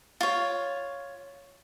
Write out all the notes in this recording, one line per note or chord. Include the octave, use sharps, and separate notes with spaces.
F4 C#5